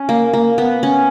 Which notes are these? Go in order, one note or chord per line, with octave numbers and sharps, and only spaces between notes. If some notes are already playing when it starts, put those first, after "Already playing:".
Already playing: C#4
A#3
A#3
B3
C#4